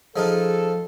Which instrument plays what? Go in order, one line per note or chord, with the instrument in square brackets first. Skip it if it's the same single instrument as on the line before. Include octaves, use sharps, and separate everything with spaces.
[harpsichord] F3 D#4 F4 [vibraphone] G#4 [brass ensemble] A4